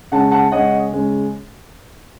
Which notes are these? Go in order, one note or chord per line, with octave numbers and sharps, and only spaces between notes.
C#3 G#3 C#4 F#5 A5
F#5 A5
C#3 G#3 C#4 D#5 F#5
C#3 G#3 C#4